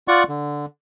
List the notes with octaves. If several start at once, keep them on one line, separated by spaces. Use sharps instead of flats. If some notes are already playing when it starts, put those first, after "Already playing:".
F4 D5 F#5 C#6
D3